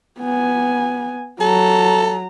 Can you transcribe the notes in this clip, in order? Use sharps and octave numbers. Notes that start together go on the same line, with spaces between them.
B3 G#5
F#3 A4 A#5